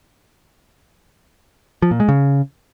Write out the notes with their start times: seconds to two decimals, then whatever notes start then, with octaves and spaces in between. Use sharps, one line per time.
1.82 F3
1.91 A#2
2.00 G#3
2.09 C#3